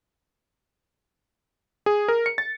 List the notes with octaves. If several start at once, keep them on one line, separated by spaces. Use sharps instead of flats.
G#4
A#4
C#7
A6